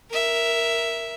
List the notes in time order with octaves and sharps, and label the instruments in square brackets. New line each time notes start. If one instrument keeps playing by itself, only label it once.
[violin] A#4 E5